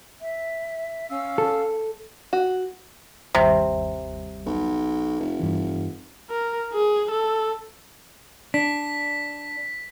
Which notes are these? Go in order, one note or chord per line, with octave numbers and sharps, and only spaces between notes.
E5
C#4 F5 E6
A4
F#4
G1 D#2 C3 G3
B1
F1
G2 E3
A#4
G#4
A4
D4 B6